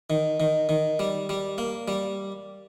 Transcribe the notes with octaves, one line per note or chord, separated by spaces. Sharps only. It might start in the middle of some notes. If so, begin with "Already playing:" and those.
D#3
D#3
D#3
G3
G3
A#3
G3